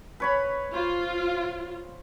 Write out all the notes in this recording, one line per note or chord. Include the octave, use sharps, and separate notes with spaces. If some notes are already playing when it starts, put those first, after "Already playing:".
B4 C#5 B5
F4 C5